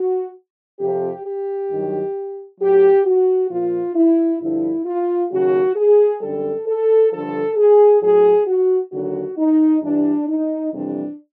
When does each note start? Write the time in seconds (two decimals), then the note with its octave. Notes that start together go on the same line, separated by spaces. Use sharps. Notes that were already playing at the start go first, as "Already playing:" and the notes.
Already playing: F#4
0.80 F2 C3 F3 G4
1.25 G4
1.70 G2 D#3 F#3
2.60 A2 F#3 G4
3.06 F#4
3.50 A#2 F3 F4
3.95 E4
4.41 G2 D3 F3 E4
4.86 F4
5.31 D#2 C#3 F#3 F#4
5.76 G#4
6.21 F#2 D3 G3 A4
6.67 A4
7.12 G2 D3 F3 A4
7.57 G#4
8.02 A2 F#3 G#4
8.47 F#4
8.92 D#2 D3 F#3 F#4
9.38 D#4
9.82 G2 E3 G3 D4
10.28 D#4
10.73 F2 C3 E3 G3 D4